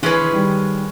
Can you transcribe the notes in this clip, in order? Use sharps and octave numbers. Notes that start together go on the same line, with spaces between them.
C#3 E3 G#3 C#4 G#4 B4
E3
D#3 G3